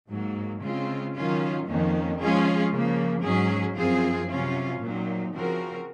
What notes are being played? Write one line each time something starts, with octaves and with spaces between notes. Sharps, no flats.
G#2 F#3 A#3
C#3 G#3 C4 F4
D#3 F#3 C#4 F4
F2 D#3 A#3 C#4
F3 G#3 C#4 F4 G#4
C#3 F3 A#3
G#2 F#3 C#4 G#4
F#2 F3 C4 F4 G#4
C3 F#3 C#4 F4
A#2 F#3 C4 D#4
C#3 F3 C4 F#4 A#4